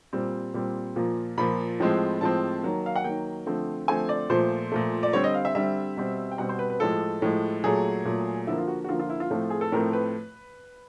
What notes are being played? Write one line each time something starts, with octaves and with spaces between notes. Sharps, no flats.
A#2 G3 C4
A#2 G3 C4
A#2 F3 A#3
A#2 F3 A#3 B5
A2 F3 G#3 C4
A2 F3 G#3 C4 A5
D#3 F#3 A#3
F5
F#5
D#3 F#3 A#3 G5
D3 F3 A3 C4
D3 F3 A3 C4 G#5
D5
A#2 F3 A3 C5
A#2 F3 A3
D5
D3 G3 C4 C#5
D#5
F5
E5
D3 G3 C4 E5
B2 G3 C4
G5
B2 G3 C4 F#5
C5
B4
B4
A2 F3 G#3 A4
A2 F3 G#3
A#2 F#3 A3 G#4
A#2 F#3 A3
D3 F3 A#3 E4
F4
F#4
F#4
D3 F3 A#3 F4
F4
E4
F4
A2 F3 A3 C4
G#4
A4
A2 F3 A3 C4 A#4
B4